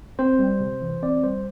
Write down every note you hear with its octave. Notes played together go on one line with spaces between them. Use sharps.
C4 C5
G3
C3
E3
C4 D5
G3 C5